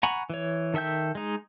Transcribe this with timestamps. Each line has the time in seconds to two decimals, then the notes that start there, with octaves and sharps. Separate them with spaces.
0.03 F#5 G#5 A#5 B5 C#6
0.30 E3 C#5
0.74 D#3 A4 E5 G5 G6
1.15 G#3 D#4